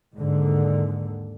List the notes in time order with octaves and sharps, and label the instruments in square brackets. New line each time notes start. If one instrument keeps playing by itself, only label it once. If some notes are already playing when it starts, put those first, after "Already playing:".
[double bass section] D#2 G#2 D3